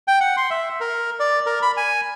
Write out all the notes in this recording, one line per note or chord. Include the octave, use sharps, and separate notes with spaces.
G5
F#5
C6
E5
A#4
D5
A#4
B5
G#5